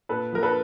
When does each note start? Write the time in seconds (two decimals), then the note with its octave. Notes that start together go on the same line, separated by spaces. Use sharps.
0.09 A#2 A4 B4
0.32 F3 A#4
0.43 A4 B4